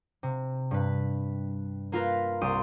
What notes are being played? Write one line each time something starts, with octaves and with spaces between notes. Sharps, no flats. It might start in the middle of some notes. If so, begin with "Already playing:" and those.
C3
G2 B4
A#3 F4 A#4 B4
C2 G4 C6 D#6 D#7